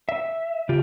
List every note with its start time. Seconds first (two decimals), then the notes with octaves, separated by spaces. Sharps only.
0.09 E5
0.69 C#3 F4 G4